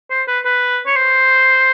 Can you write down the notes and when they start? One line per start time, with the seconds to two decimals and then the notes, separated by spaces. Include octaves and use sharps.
0.10 C5
0.28 B4
0.45 B4
0.87 C#5
0.96 C5